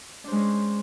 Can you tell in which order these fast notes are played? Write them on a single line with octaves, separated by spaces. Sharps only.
D4 C5 G#3 C#4